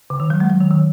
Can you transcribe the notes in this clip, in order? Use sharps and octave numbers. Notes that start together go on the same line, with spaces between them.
C#3
D#3
F#3
G#3
F#3
D#3
D#3